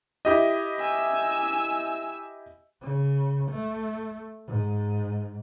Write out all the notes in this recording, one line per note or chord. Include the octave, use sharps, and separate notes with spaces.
E4 G4 D#5
G#5 E6
C#3
A3
G#2